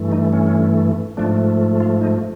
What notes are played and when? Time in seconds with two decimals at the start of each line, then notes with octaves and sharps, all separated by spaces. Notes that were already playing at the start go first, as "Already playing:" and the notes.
Already playing: G2 E3 A3
0.12 D#4
0.33 C#4
1.17 G#2 F3 A3 D4
1.80 F4
2.01 D#4